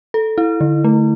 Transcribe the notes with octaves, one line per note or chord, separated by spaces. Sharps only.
A4
E4
D3
A3